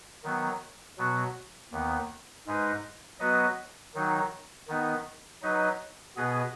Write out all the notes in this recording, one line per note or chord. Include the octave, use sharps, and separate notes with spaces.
D#3 F#3 B3
B2 F#3 B3 F#4
D#2 D#3 B3
G#2 G#3 D#4 B4 D#5
F#3 B3 F#4 B4 D#5
D#3 F#3 D#4
D#3 B3 D#4
F#3 D#4 B4 D#5
B2 B3 G#4 B4 D#5